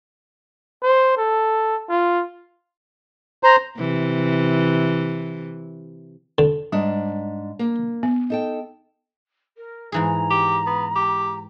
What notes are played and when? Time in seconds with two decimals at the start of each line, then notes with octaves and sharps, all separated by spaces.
0.83 C5
1.17 A4
1.89 F4
3.43 C5 A#5
3.78 C3 E3
6.38 D3
6.72 G#2 G3 D4
7.59 A#3
8.03 B3
8.30 D#4 A4 G5
9.57 A#4
9.92 G#2 E3 G#4 A#5
10.31 G4
10.67 B3
10.96 G4